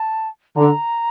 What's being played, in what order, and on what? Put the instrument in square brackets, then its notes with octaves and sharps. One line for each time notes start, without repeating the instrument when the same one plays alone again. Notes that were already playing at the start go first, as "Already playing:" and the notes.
Already playing: [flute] A5
[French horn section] D3 [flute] A#5